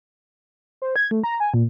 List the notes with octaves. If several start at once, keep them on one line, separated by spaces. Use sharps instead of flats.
C5
G#6
A3
A#5
G#5
A#2